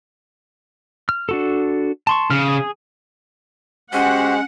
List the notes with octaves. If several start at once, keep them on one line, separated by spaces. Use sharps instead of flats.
F6
D4 F#4 A4
A5 C6 C#6
C#3 F6
G#4
G#3 C#4 F#4 G4 C5 F#5